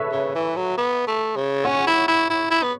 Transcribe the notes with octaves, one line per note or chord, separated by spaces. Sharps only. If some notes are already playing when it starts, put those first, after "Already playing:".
Already playing: A4 B4 C#5 E5
C#3
E3
F#3
B3
A3
C#3
C#4 C#5 F#5
E4
E4
E4
E4
B3